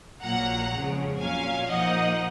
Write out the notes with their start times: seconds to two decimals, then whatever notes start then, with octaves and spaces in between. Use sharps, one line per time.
0.22 A#1 A#2 F#3 A#3 F#5 A#5
0.71 F2 C#3 G#3
1.19 A#2 F#3 C#4 F5 G#5
1.68 A#2 F3 A#3 D#4 D#5 F#5